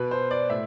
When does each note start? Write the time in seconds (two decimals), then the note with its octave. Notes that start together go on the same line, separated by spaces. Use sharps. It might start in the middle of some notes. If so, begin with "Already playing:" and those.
Already playing: B2 B4
0.11 C5
0.31 D5
0.49 A2 E5